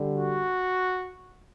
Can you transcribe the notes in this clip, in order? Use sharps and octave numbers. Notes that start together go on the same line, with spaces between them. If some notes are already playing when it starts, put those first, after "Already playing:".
Already playing: D3 G3
F#4